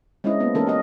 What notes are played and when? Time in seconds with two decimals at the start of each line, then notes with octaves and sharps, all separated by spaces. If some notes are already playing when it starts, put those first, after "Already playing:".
0.24 G#3 C#4 D4 E4 C5 D#5
0.40 A#3 B3 E4
0.55 E3 A#3 C#4 D#4 A4 A#4
0.67 G4 A4 D#5